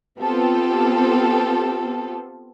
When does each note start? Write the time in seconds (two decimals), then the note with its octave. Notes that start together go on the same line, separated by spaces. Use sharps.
0.19 B3 C4 F4 G4 A4